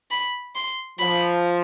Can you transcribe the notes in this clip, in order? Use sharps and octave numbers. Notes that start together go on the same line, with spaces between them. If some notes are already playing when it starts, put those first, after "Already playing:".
B5
C6
F3 B5